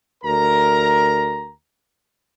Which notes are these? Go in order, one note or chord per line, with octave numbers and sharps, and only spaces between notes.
D2 A#4 A#5